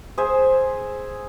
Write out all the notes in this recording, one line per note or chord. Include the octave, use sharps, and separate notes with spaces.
G#4 C5 E5